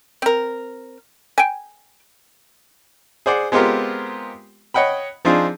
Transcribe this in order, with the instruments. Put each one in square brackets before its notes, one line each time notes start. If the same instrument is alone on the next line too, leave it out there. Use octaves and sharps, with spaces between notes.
[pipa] C4 A#4
G5 G#5
[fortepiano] G#4 C5 D5 F#5
G#3 B3 C4 F4 G4 A#4
C#5 D#5 F#5 G5 B5
F3 C4 D4 D#4 F4 G#4